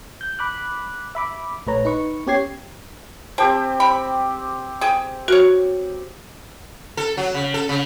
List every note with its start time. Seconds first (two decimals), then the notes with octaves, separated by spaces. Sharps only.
0.21 G6
0.39 B5 D6 F#6
1.15 E5 B5 D6
1.67 A#1 A3 B4 C#5 A#5
1.85 D#4 B4 C#6
2.27 B3 C#4 G4 C#5 G#6 C7
3.38 C4 G4 C5 G5 A5
3.80 G5 B5
4.81 G#4 G5
5.28 F#4 A#4 C#5
6.97 A4
7.17 F#3
7.34 C#3
7.54 A4
7.69 C#3